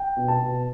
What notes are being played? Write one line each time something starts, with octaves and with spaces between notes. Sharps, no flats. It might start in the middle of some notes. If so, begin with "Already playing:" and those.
Already playing: G5
B2
A5
B2